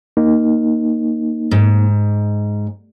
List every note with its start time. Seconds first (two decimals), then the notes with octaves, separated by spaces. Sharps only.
0.17 A#3 D#4
1.51 G#2